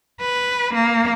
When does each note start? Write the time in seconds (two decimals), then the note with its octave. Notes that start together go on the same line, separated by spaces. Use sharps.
0.21 B4
0.74 A#3